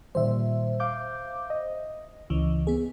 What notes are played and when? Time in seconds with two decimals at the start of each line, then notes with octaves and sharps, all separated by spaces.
0.15 A#2 D#3 G3 C5 E5
0.80 F5 D6 G6
1.50 D#5
2.30 C#2 C#3 E3
2.67 B3 G#4